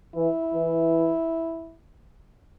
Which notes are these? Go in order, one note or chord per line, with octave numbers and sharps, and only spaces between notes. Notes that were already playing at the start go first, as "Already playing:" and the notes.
E3 E4
E3